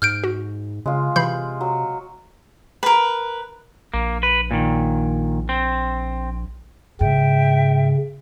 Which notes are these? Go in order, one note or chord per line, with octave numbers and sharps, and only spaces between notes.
G#2 F6 G6 D7
F#4
C#3 G#3 F4
C3 E3 B5 G6 C7
F#3
A#4 B4
A#1 A#3
B4
A#2 D#3
C4
G#2 C#3 E5 G5